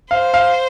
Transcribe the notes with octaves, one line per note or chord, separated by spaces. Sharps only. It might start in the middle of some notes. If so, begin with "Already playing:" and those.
C5 F5
F5